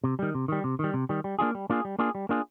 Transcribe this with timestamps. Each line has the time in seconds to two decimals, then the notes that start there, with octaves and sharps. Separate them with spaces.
0.04 C3
0.19 D#3 G3
0.35 C3
0.48 D#3 G3
0.64 C3
0.79 D#3 G3
0.94 C3
1.09 D#3 G3
1.24 G3
1.39 A#3 D4 F4 G#4
1.55 G3
1.70 A#3 D4 F4 G#4
1.85 G3
1.99 A#3 D4 F4 G#4
2.15 G3
2.29 A#3 D4 F4 G#4